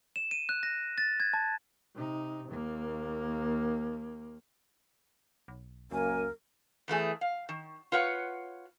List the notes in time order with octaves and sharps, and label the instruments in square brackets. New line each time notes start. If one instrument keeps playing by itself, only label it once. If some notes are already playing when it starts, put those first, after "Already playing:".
[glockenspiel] E7
D#7
F#6
A#6
A6
G#6
A5
[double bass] C3 D#4
D#2 A#3
[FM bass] B1
[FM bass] C#2 [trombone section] F#2 A#3 [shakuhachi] A#4 [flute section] G#5
[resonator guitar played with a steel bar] E2 E3 A3 G#4
F5
D#3
F4 B4 C#5 F#5